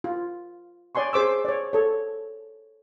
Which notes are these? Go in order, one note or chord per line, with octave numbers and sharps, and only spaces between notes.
F4
C#5 D5 G#5 C6 C#6
G#4 C5 D6 E6
C#5 D5
A4 C#5